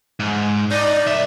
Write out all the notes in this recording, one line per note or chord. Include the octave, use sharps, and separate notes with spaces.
G#2
D#4 D5
C2 E5